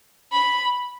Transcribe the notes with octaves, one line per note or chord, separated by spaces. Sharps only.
B5